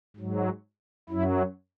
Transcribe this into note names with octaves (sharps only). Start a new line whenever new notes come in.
G#2 F#3
F#2 F#3 E4